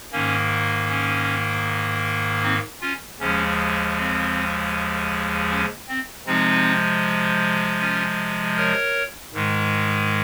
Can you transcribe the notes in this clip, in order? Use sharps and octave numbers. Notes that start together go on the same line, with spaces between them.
G#2 D#3 A#3 C#4
C#4
C4 D#4
C#4 F4
D#2 C#3 F3 G#3 C#4
C4
C#4
C4
C3 F3 G#3 C4 D#4
C#4 F4
A#4 C#5
G#2 D#3 G#3